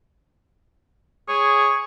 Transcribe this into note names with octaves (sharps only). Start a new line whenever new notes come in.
G#4 C#5